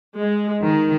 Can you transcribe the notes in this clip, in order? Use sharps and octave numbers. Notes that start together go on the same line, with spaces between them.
G#3
D#3